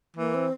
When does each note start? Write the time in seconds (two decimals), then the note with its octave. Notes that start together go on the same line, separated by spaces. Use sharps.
0.16 E3 A#3
0.34 C4